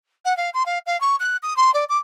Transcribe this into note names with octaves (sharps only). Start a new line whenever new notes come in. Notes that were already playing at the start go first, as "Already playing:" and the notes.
F#5
F5
C6
F5
F5
C#6
F#6
D#6
C6
D5
D6